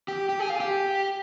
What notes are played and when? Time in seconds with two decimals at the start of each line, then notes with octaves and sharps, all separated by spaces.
0.08 G4
0.29 G4
0.39 G#4
0.50 F4
0.60 G4